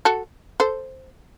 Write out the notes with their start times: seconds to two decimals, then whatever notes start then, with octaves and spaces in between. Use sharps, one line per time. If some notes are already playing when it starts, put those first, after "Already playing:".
0.05 F#4 A4
0.60 A4 C5